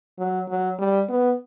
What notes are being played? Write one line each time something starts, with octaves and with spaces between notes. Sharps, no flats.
F#3
F#3
G3
B3